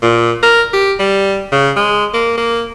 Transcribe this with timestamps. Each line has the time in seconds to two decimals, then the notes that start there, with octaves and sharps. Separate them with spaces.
0.03 A#2
0.42 A#4
0.73 G4
0.99 G3
1.52 C#3
1.77 G#3
2.14 A#3
2.37 A#3